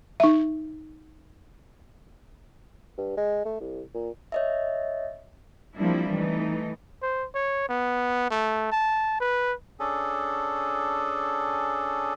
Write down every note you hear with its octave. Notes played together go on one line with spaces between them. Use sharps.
D#4 E5
G2
G#3
A3
C2
A#2
C#5 D#5 E5
F3 G3 A#3 C4 D4 E4
E3 A3 D#4
C5
C#5
B3
A3
A5
B4
C#4 D4 G#4 A4